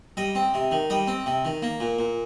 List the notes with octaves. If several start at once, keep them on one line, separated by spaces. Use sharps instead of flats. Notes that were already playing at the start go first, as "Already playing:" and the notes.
G3 D#5
C4
C3
D#3
G3 D#5
C4
C3
D#3
A#3
A#2
A#2